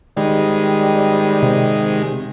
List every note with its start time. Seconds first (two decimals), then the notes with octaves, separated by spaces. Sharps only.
0.17 D#3 G3 G#3
1.43 C3